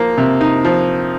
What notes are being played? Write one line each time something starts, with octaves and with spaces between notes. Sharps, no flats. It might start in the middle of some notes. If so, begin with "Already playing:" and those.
Already playing: F3 A#3
C3
D#4
F3